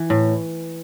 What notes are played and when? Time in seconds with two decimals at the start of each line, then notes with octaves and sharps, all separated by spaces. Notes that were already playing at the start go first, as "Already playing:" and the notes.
Already playing: E3
0.10 A2